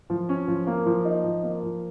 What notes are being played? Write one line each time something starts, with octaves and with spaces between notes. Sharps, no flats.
F3
C#4
F3
A#3
F3
D#4
F3
A#3
F3